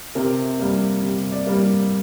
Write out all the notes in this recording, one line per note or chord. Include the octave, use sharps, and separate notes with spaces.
C3 A#4
G3 A#3
C3
D5
G3 A#3